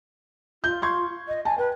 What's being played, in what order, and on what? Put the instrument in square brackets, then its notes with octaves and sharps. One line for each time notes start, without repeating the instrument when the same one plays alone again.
[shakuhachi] F4 [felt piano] G6
[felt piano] C6 C#6 G#6
[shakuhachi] D#5
[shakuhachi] G#5 [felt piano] A5
[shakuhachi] B4 [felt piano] G5